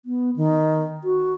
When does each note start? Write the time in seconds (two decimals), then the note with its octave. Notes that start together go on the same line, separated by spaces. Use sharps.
0.05 B3
0.36 D#3
1.04 F#4